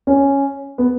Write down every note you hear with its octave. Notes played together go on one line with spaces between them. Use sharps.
C#4
B3